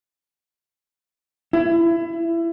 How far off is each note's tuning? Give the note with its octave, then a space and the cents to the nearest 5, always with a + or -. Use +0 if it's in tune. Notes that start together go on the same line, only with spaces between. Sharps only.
E4 +25